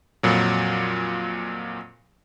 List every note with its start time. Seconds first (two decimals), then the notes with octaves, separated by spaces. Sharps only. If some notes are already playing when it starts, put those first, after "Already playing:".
0.23 F2 A#2 F#3